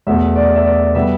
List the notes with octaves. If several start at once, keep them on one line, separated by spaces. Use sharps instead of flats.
E2 B2 A3 E5
D5
E5
D5
B2 G3 B3 E5